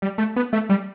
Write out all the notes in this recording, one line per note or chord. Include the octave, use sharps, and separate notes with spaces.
G3
A3
B3
A3
G3